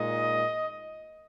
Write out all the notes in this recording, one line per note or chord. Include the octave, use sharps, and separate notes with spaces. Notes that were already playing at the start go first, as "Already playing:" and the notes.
Already playing: A#2 G#3 D#4 D#5